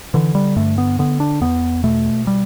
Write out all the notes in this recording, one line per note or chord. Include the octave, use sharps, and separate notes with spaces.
D3 E3
G3
G2 A3
B3
D3 B3
D4
E2 B3
B2 A3
G3